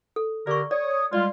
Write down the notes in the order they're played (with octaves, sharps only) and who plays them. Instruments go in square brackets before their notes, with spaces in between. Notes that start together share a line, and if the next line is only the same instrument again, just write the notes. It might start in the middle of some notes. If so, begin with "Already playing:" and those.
[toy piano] A4
[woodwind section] D3 G4 A#4 [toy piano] D5 C#6
[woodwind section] C#5 D#6 [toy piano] D5
[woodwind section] G3 G#3 F4 [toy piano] D5